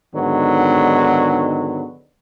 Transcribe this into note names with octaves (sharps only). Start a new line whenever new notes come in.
G#2 D3 D#3 F#3 G#3 B3